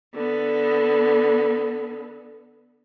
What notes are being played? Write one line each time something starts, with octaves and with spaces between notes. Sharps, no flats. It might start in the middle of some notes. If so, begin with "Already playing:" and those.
D3 B3